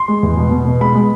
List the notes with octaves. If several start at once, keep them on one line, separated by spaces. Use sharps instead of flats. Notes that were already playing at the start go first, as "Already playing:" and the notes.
Already playing: C6
G#3
E2
B2
B2
B2
G#3 B5
G#3